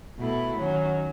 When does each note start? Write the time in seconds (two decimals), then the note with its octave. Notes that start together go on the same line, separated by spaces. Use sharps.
0.19 B2 A3 E4
0.57 D#3 F#3 C#4